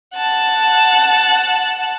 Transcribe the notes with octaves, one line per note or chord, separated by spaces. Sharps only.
F#5 A5